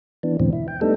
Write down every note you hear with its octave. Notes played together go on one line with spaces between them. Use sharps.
E3 B3 D4
E2 G#2 B2 D3 E3 C4
E4
G5
G3 A3 B3 D4 D#4 A4